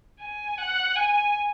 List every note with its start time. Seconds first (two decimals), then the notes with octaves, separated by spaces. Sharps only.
0.20 G#5
0.58 F#5
0.95 G#5